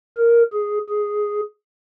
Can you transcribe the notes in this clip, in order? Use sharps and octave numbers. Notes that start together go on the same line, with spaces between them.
A#4
G#4
G#4